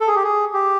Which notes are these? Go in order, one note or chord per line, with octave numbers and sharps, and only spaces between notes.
A4
G#4
G4
G#4
G4